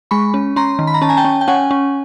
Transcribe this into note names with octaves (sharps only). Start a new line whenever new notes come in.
G#3 B5 C#6
C#4
C#4 A#5 C6
D#3
B5
A#5
C#4 A5
G#5 A#5
G5 A5
C#4
G5
C#4 F#5 G#5
C#4